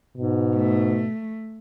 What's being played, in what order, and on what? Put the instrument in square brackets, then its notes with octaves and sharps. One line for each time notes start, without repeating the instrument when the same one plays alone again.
[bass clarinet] G#2 [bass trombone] B2
[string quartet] A3